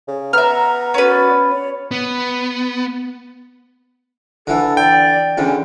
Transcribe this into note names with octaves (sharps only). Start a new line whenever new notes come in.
C#3
B3 E5 A#5 F6
C#4 F#4 B4 D5
C#5 B5
B3
D3 E3 A4
D5 G5
E2 D3 C#4